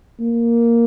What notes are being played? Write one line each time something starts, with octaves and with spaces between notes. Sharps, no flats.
A#3